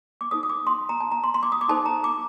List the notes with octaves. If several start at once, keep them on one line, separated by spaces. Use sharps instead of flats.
D6
D#4 A4 C5 D#6
D#6
D6
C6
A#5
A5
A#5
C6
C6
D6
D#6
D6
D#4 A4 C5 A5
A#5
D6